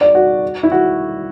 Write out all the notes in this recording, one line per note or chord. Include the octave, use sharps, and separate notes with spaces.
D5
F#4
E4
F#4